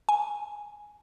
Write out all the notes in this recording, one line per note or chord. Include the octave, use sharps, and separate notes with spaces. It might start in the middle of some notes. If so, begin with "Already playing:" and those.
G#5